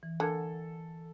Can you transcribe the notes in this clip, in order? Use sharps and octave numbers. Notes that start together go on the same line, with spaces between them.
E3
D3 A#3 A4 G#5 G#6